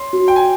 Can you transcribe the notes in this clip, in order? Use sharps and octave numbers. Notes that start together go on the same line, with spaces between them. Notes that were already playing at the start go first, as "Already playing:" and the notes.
Already playing: C#5 C6
F#4
G5
G#5